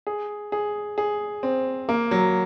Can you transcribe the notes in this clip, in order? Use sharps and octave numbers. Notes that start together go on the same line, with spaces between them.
G#4
G#4
G#4
C4
A#3
F#3